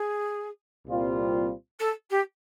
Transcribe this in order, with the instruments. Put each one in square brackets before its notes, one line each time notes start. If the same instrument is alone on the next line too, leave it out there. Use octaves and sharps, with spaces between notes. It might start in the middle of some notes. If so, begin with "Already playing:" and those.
Already playing: [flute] G#4
[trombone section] C2 A#2 G3 C4 F4
[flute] A4
G4